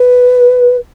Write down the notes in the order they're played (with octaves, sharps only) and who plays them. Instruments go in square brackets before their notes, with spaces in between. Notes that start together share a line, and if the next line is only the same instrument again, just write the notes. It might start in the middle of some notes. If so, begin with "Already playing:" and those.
Already playing: [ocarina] B4